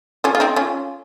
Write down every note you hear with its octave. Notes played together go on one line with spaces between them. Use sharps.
C#4 F4
F4
C4 D#4
C#4 F4